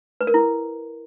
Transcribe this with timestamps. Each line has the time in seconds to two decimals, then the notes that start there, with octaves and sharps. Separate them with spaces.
0.21 B4
0.27 A#4
0.34 E4